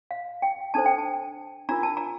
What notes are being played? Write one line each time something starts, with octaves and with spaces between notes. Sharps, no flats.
F5
G5
D4 A4 C5 A5
G5
A5
D4 F4 A#4 A#5
A5
A#5